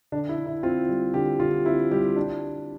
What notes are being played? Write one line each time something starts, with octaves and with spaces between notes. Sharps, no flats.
D3 D4
E4
D3
E4
C4 F4
G3
D3 G4
D3 F4
C4 E4
G3 G4
D4